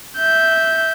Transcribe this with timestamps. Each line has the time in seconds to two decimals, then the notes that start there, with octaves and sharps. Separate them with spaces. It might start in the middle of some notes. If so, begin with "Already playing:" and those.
0.18 E5 G6